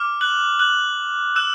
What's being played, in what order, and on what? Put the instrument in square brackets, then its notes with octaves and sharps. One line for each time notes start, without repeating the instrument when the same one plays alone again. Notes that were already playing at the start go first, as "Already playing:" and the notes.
Already playing: [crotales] D6 F6
F#6 F#7
F#6 F#7
E6 F#6 E7